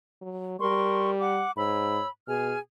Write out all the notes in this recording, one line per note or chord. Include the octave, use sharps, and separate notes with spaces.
F#3
G3 A#4 C6 C#6
F#5 D6
G#2 C#5 B5 E6
B2 G#4 G#5 F6